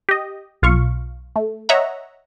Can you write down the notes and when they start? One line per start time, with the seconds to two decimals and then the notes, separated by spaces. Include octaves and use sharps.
0.09 G4 D#5
0.62 B1 F4 F5 C#6
1.36 A3
1.69 C#5 D#5 E5 F#5 A#5